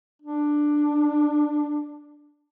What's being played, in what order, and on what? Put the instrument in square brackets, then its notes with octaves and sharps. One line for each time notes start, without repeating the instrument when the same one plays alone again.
[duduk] D4